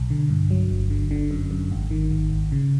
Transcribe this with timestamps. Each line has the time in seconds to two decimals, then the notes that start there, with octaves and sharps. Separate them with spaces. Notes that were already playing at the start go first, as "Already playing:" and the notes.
Already playing: B1
0.10 D3
0.30 G2
0.51 F#3
0.70 G1
0.90 D3
1.11 D3
1.31 F#2
1.51 F#2
1.71 G#1
1.91 D#3
2.11 G#1
2.31 G#1
2.52 C#3